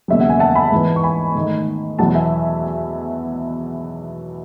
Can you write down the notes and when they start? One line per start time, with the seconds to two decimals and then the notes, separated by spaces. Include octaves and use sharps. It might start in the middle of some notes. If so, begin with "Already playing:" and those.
0.08 E1 D#2 C#3 F#3 E5
0.20 F#5
0.29 G#5
0.39 F#5 A5
0.55 G#5 B5
0.72 G#2 E3 B3
0.96 C#6
1.04 G#5 B5
1.35 G#2 D#3 A3
1.99 E2 B2 F#3 B3 E4 F#5 A5
2.15 E5 G#5